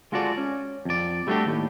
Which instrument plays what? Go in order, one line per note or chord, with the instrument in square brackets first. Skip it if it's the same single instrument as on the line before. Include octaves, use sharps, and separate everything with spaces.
[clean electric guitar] G#3 F4 F#4 A4 D5
C#4
F2 D5
G3 A3 B3 D4 F#4 G4
D#2 A2